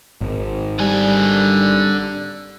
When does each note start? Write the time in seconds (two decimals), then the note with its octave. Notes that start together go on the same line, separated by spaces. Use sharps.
0.21 G#1
0.79 D3 G3 G#5